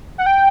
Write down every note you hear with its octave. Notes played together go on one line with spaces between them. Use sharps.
F#5
G5